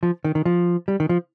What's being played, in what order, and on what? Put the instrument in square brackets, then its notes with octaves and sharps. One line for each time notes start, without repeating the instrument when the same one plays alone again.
[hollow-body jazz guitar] F3
D#3
D#3
F3
G3
D#3
F3